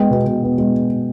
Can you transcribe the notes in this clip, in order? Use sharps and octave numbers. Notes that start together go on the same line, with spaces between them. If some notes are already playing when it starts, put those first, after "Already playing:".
Already playing: G#3 B3 G5
B2
B2
B3
G#3